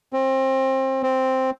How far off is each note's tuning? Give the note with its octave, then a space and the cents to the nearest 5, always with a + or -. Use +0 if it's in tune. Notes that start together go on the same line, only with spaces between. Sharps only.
C4 +25
C4 +0